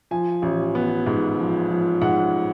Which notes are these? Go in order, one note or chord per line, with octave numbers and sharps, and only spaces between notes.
F3 G#5
A1
B3
G#2
F3
F3
G#2 F#5